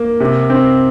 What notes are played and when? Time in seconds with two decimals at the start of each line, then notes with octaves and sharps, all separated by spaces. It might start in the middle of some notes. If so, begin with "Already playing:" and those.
Already playing: A#3
0.20 C3
0.50 C4